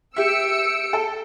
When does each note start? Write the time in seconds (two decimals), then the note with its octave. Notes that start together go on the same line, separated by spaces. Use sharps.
0.17 G4 E5 E6 C#7 D7
0.93 A4